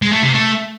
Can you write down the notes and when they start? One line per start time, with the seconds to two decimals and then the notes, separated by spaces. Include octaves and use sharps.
0.02 G#3
0.12 A3
0.23 C3
0.33 A3